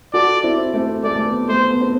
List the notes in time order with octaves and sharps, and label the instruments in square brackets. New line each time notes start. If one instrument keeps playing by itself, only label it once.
[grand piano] F#4 A4 [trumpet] D5
[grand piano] C4 E4
A3 C4
[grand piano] A3 [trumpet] D5
[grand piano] A3
B3
[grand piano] A3 [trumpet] C5
[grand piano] B3
C4